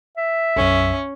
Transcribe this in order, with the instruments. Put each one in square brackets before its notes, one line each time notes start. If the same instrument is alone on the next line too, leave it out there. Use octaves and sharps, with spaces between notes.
[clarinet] E5
[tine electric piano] B1 F#2 [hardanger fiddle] C#4